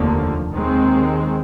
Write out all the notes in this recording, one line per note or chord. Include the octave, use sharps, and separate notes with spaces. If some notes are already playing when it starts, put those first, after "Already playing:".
Already playing: F1 D#2 D3 F3 A#3
D#2 D#3 G#3 C4